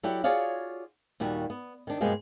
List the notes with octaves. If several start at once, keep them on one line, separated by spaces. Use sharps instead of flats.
F#3 E4 F#4 G4 A4 D5
F4 F#4 G#4 C#5 D5 F5
D#2 A#2 G3 F#4
B3
D#3 D4
G2 B2 F3 G#3 A#3 G4